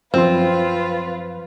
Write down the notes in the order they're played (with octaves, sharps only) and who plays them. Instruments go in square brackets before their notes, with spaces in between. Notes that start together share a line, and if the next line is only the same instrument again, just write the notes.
[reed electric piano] F#2 F3 C6 [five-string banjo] C4 [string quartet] F4 B4